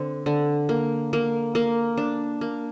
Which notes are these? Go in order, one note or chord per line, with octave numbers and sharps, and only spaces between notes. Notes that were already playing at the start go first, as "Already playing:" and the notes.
Already playing: D3 C4
D3
A#3
A#3
A#3
D4
A#3